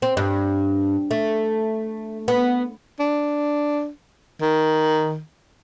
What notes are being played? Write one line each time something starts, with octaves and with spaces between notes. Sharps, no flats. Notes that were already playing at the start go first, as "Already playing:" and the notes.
C4
G2
A3
B3
D4
D#3